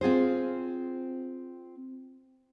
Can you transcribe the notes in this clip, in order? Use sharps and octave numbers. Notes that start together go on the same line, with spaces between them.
C4 F4 G#4 C5